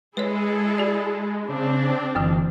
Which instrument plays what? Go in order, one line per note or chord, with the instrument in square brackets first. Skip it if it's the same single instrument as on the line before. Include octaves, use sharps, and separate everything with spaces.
[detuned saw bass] G#3 [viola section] E4 G#4 A4 [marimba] B4 C#5
[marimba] F#4 D5
[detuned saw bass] C#3 [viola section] C4 D4
[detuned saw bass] F#1 [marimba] F#2 D3 E3